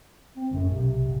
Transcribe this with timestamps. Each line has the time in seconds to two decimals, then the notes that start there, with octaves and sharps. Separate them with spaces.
0.36 C4
0.51 F#1 F#2 A2 C#3
0.69 B1 C3
1.06 D#1 G#1 C#2